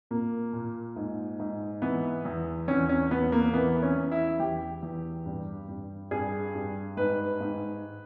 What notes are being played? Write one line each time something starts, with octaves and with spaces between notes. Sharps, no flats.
A#2 A#3
A#2
G#2
G#2
E3 B3
E2
E2 C#4
C#4
E2 B3
A#3
E3 B3
C#4
E2
E4
E2 G4
E2
G2
G2
G2 G#4
G2
G#2 B4
G#2